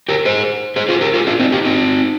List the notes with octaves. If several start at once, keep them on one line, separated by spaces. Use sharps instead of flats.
G4 A#4
G#4 C5
G#4 C5
F4 G#4
G4 A#4
F4 G#4
D4 F4
C4 D#4
D#4 G4
C4 D#4